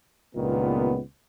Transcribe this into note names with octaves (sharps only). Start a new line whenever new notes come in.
C#2 G2 A#2 D#3 B3